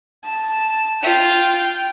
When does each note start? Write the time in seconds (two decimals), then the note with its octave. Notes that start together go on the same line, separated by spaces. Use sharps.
0.24 A5
1.03 F4 G5